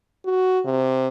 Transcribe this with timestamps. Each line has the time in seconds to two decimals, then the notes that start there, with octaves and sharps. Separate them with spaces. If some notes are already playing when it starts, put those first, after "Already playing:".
0.25 F#4
0.65 C3